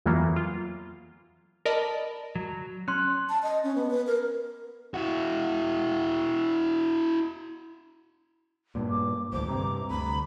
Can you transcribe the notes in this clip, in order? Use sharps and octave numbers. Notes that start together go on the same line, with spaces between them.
F2 E3 F#3 A#3 B3
F4
A#4 D5 D#5 A5 B5
F#3
C#4 C6 F#6
A5
D#5
C#4
B3
B4
A#4
E4 F#4
G2 A#2
D6
A1 D2 C5 D6
G2 C3 A#5
D2 B5